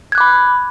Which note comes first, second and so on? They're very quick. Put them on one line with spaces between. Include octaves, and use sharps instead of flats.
G#6 F#6 D6 B5